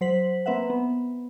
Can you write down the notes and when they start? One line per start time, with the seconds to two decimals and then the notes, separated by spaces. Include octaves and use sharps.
0.01 F#3 C5 B6 F#7
0.46 A#3 C4 B4 E5 F#5
0.70 B3